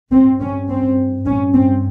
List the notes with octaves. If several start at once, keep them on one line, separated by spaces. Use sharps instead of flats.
G2 C4
C#4
C4
G2 C#4
C4